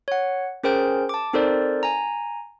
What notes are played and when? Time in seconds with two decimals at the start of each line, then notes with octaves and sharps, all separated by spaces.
0.08 C#5 F#5
0.64 C#4 G#4 A#4 C5 G5 G6
1.09 A5 D6
1.33 C4 D#4 A4 A#4 C5 D5
1.83 G#5 A#5